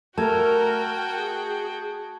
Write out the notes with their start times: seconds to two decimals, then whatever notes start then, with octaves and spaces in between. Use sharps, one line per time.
0.18 A3 F#4 A#4 G5 A5 C#6 G#6
1.15 G#4